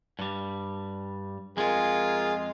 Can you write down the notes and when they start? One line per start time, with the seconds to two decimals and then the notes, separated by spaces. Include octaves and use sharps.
0.19 G2 G3
1.57 F2 G#3 F4 G#4 A#4